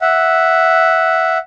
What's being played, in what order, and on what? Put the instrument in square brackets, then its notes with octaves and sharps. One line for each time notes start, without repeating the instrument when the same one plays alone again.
[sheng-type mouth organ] E5 F#5